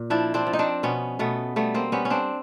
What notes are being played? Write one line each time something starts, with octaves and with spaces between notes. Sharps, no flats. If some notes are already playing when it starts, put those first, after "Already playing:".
Already playing: A#2
F3 D4 E4
C4 D4
F3
D#4
C4 D4
B2 B3 C#4
B2 A3 B3
G3 A3 B3
A#3 C4
G3 B3 C#4
C#4
C4 D4